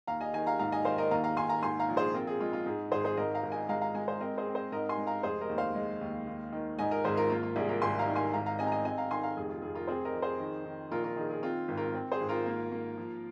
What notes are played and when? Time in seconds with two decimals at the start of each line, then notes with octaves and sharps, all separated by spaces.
0.07 D#2 F5 A#5
0.21 D#5 G#5
0.34 D#3 D#5 G#5
0.47 F5 A#5
0.59 G#2 F5 A#5
0.72 D#5 G#5
0.85 D#3 C5 F5
0.98 A#4 D#5
1.11 D#2 F5 A#5
1.24 F5 A#5
1.36 D#2 G#5 C6
1.49 F5 A#5
1.62 G#2 G#5 C6
1.80 F5 A#5
1.89 A#1
1.97 G#4 C5
2.14 C4 F4 A#4
2.27 G#4
2.40 G#3 F4
2.53 F4
2.66 G#2 G#4
2.91 G#1 G#4 C5
3.05 G#4 C5
3.17 G#2 A#4 D#5
3.35 F5 A#5
3.43 G#1
3.52 D#5 G#5
3.69 G#3 F5 A#5
3.81 F5 A#5
3.94 G#3 D#5 G#5
4.08 C5 F5
4.20 C4 A#4 D#5
4.38 G#4 C5
4.47 C4
4.55 G#4 C5
4.72 G#2 A#4 D#5
4.89 G#5 C6
4.98 G#3
5.07 F5 A#5
5.23 F1 G#4 C5
5.41 A#4 D#5
5.49 D#2
5.58 C5 F5
5.75 G#3
6.01 D#2
6.27 D#2
6.52 D#3
6.79 G#2 D#5 G#5
6.91 A#4 D#5
7.04 G#1 G#4 C5
7.17 F4 A#4
7.30 A#3 F4
7.43 F4
7.56 C2 G#4
7.69 F4 A#4
7.81 G#1 G#5 C6
7.99 F5 A#5
8.07 D#3
8.16 G#5 C6
8.34 G#2 F5 A#5
8.46 F5 A#5
8.59 C4 D#5 G#5
8.67 A#5
8.72 D#5 G#5
8.84 C4 D#5 G#5
8.98 F5 A#5
9.11 D#3 G#5 C6
9.23 F5 A#5
9.37 F1 G#4
9.49 F4
9.62 F1 G#4
9.75 F4 A#4
9.87 C4 G#4 C5
10.05 A#4 D#5
10.14 F2
10.22 G#4 C5
10.39 D#3
10.66 D#3
10.91 A#1 F4 A#4
11.04 F4 A#4
11.17 D#3 G#4
11.30 G#4
11.43 C4 F4
11.68 G#1
11.77 F4 A#4
11.95 C4
12.12 G#4 C5
12.21 G#1
12.29 F4 A#4
12.46 A#3
12.72 A#3
12.98 F3